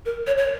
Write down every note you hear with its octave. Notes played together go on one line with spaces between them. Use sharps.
A#4
C#5
C#5